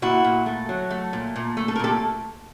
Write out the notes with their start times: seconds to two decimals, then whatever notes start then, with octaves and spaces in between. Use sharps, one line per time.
0.02 A#2 E4 F#4
0.24 A#2
0.46 A3
0.69 F#3
0.90 A3
1.13 A#2
1.36 A#2
1.57 A3
1.68 A4
1.76 A#4
1.79 A#2 G4 A4